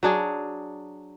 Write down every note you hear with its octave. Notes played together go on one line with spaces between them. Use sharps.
F#3 D4 G#4